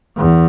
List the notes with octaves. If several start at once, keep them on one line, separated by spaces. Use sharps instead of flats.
E2